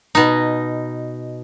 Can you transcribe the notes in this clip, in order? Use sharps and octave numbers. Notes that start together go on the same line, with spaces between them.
B2 D#4